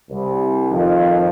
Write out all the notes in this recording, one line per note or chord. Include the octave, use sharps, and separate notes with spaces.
C2
F2 D#3 F3